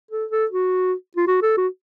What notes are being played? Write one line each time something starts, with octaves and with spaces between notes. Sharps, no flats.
A4
A4
F#4
F4
F#4
A4
F#4